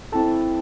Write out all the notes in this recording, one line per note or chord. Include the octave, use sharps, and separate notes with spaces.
C4 E4 A4 A5